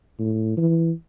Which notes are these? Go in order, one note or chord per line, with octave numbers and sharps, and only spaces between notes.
A2
E3